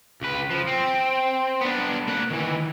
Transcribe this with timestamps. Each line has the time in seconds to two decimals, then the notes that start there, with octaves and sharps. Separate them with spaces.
0.21 C#2 B4
0.50 F3
0.67 C4
1.61 B3 D4
2.08 A#3 F#5
2.30 D#3 E3